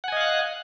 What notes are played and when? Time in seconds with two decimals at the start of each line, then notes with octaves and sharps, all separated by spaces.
0.04 F#5
0.08 G#5
0.12 D#5
0.17 F5
0.21 F#6